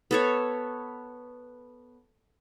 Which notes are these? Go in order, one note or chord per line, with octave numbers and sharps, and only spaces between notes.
B3 A4 C#5